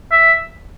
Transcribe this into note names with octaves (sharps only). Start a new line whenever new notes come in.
E5